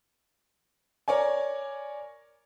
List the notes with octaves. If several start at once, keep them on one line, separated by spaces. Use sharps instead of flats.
A#4 C#5 D5 G#5